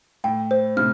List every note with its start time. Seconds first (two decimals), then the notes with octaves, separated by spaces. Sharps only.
0.24 A2 G5
0.51 C5
0.77 A2 C3 F6